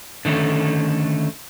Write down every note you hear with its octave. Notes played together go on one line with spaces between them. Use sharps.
D3 D#3 A3 C#4